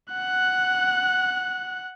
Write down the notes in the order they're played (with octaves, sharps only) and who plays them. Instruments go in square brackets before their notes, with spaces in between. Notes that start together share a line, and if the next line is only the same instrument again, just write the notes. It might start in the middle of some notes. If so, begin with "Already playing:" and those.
[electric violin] F#5 F#6